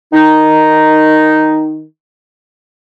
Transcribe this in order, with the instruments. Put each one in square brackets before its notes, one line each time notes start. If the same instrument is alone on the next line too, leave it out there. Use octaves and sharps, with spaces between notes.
[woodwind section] D#3 D#4